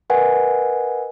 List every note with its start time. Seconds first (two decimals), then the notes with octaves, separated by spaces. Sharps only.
0.10 A#4 B4 D#5 F#5 G#5